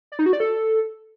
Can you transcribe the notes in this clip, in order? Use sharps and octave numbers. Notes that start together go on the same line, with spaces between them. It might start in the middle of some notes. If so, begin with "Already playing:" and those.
D5
D#4
F#4
D5
A4